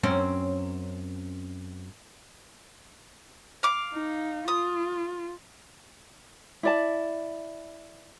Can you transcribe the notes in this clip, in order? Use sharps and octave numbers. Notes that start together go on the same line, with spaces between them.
F#2 C4 C#4
F5 D6
D#4
F4 D#6
E4 D5 A5